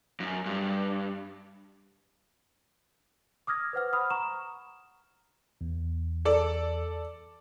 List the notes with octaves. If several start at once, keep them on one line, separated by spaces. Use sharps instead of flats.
F#2
G2
D6 D#6 F6 G#6 A#6
B4 C5 F#5 F6
F#5 B5 D#6 F6
A#5 C#6 E7
E2
A4 D5